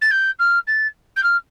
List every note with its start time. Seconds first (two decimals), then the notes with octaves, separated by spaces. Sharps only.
0.01 A6
0.11 G6
0.39 F6
0.67 A6
1.16 G6
1.23 F6